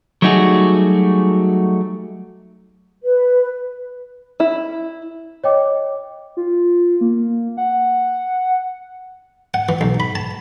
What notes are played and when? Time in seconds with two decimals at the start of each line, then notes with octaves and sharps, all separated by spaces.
0.22 F#3 G3 A3 D#4 F#4 G#4
3.04 B4
4.40 E4
5.44 C#5 D#5 G5 D6
6.37 F4
7.01 A#3
7.57 F#5
9.54 F#5
9.69 E3
9.81 B1
10.00 B5
10.15 A5